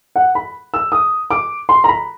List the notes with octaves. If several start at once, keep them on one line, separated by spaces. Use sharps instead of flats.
F#5
B5
E6
D#6
D6
C6
A#5
B5